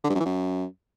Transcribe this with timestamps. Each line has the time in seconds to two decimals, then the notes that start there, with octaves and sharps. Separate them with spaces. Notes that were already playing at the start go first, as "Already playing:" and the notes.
0.04 D3
0.10 G2
0.15 F#2
0.20 E3
0.26 F#2